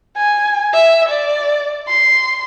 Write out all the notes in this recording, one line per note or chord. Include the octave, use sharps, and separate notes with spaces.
G#5
E5
D5
C6